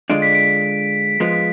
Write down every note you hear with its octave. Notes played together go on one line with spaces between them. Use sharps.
D3 G#3 D4 F4 D7
B6
D7
F3 G#3 B3 F4 B6